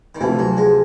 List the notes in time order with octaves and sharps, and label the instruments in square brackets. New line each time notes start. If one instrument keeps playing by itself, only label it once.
[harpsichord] D#3
[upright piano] D2 C3 F3 [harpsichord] E3
[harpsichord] F#3
G#3